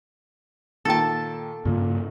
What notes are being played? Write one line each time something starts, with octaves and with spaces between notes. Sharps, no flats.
A#2 D#3 A4 G5 A5
G2 A#2 C#3 A#3